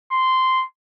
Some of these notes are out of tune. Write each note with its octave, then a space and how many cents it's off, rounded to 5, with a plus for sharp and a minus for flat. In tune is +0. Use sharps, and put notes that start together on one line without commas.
C6 -10